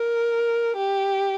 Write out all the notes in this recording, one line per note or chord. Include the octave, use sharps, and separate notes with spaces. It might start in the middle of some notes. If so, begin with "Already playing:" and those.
Already playing: A#4
G4